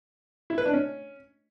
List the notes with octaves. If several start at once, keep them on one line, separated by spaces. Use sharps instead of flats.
E4
B4
D4
C#4